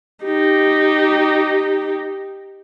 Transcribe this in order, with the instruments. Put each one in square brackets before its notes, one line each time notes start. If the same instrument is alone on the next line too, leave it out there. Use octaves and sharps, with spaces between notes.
[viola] D#4 G4